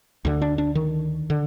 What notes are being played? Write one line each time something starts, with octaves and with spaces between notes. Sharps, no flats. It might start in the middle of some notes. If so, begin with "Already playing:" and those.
D2 D3
D4
D4
D#3
D3